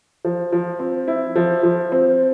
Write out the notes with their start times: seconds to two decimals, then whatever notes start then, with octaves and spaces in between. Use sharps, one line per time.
0.25 F3
0.52 F3
0.79 C4
1.08 E4
1.36 F3
1.63 F3
1.92 C4